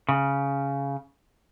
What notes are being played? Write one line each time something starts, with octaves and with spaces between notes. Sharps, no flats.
C#3